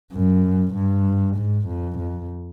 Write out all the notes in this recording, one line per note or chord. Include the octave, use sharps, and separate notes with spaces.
F#2
G2
G#2
F2
F2